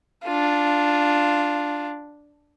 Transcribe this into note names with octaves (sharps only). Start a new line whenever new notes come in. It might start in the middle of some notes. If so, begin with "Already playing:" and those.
D4 F4